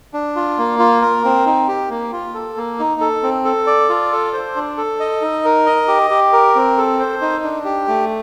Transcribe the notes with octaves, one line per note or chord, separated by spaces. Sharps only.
D4
F4
A#3
F4
A#4
C4
D#4
G4
A#3
F4
A4
A#3
D#4
A4
C4
A4
D5
F4
A4
C5
D4
A4
D#5
D#4
A#4
D#5
G4
G4
A#4
C4
A4
C5
D#4
D4
G4
A3